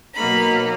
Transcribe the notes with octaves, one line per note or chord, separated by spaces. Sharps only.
B2 F#3 A#3 D#4 B5